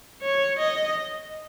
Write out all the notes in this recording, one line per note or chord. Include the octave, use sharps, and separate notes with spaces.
C#5
D#5